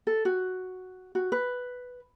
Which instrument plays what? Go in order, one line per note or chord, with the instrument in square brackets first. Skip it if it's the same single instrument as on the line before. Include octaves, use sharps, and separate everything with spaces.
[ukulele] A4
F#4
F#4
B4